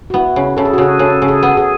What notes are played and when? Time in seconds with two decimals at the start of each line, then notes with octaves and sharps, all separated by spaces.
0.10 F#4
0.14 B3 E4
0.36 C#3
0.57 C#3 A4
0.65 G#4
0.73 F#4
0.78 C#3 G#4
0.99 C#3 A4
1.22 C#3
1.28 G#4
1.43 B3
1.57 G#4